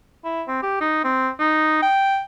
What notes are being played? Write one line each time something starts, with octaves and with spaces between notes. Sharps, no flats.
E4
C4
G4
D#4
C4
D#4
G5